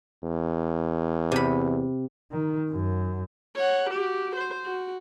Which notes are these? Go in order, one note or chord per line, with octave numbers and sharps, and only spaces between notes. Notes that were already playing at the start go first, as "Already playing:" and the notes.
E2
C3 B5
D#3
F#2
C#5 F#5
F#4 G4
C5
F#4